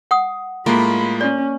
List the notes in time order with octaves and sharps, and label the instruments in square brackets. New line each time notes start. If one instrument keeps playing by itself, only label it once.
[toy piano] F#5 D#6
[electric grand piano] A2 G#3 F4 [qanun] A#3 [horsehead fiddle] B5
[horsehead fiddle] C#4 [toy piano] D5